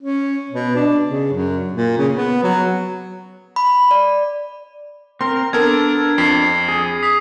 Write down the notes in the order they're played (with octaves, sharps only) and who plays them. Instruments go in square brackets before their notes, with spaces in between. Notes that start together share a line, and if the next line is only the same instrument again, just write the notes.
[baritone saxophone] C#4
B2
D4
C#3
F#2
A#2
C#3
B3
F#3
[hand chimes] B5
D5
[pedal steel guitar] C4 A#4 [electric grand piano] C6
[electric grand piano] B3 A4 A#4 [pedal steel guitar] D4 [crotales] G#6
[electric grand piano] F2 [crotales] B6 C7
[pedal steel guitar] G#4
[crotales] D#6 B6